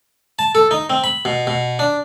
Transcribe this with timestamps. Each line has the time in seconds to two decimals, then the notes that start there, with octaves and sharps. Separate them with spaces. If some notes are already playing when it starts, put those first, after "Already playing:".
0.39 A5
0.55 A4
0.71 D#4
0.90 C4
1.04 B5
1.25 B2
1.47 B2
1.79 D4